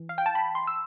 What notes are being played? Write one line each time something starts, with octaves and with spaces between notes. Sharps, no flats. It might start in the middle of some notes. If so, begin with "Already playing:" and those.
Already playing: E3
F5
G5
A5
B5
C6
E6